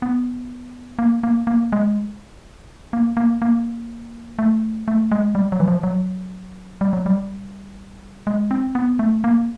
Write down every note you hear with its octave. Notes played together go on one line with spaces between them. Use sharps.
B3
A#3
A#3
A#3
G#3
A#3
A#3
A#3
A3
A3
G#3
G3
F#3
E3
F3
F#3
G3
F#3
G3
G#3
C4
B3
A3
A#3